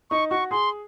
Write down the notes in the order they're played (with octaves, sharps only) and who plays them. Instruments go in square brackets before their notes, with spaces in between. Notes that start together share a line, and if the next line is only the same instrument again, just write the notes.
[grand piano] D#4 [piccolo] C#6
[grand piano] F#4 [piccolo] C#6
[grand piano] G#4 [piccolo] C6